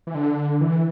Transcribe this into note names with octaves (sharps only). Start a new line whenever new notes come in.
E3
D3
E3